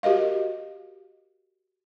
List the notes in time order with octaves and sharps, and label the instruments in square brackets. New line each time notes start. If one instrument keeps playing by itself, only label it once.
[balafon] F#4 G4 A#4 D#5 F5